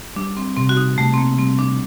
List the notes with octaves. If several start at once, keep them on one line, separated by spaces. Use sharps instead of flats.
G3 D4
C4
C3 C4
F#4
D#4
C3 A3
C4
A#3
G3 C4
D4